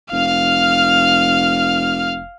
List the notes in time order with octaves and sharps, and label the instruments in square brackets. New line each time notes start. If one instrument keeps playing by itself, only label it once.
[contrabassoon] F1 [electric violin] F5 F6